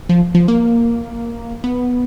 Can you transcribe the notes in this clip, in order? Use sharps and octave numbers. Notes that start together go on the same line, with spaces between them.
F3
F3
A#3
B3